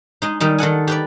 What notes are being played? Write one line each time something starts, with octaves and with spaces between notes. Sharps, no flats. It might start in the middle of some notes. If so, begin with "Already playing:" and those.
G#3 D#4
D#3 G3 D#4
D#3 A4 F#5 G#5
G4 B4 D5